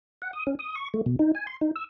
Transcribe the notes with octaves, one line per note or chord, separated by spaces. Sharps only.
F#5
D#6
C#4
D#6
C#6
A3
B2
D#4
G#5
C6
D#4
E6